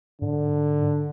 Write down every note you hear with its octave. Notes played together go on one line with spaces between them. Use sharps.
G#2 D3